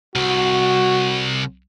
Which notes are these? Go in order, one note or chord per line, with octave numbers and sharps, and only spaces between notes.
C2 F#4